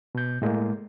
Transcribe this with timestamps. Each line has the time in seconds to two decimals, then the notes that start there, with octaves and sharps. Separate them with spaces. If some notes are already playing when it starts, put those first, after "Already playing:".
0.15 B2 G6
0.42 A2 G#3 A#3